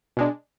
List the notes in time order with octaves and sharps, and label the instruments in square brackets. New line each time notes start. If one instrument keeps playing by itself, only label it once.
[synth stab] B2 G#3 D4